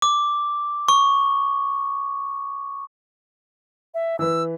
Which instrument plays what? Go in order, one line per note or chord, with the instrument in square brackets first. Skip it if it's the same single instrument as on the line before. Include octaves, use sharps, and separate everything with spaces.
[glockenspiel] D6
C#6
[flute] E5
[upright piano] E3 B4 [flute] E6